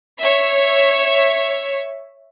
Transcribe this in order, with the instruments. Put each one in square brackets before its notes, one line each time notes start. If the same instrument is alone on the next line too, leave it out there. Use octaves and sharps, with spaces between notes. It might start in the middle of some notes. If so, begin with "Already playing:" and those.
[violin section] C#5 E5